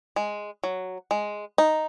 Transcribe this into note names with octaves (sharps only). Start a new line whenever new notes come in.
G#3
F#3
G#3
D#4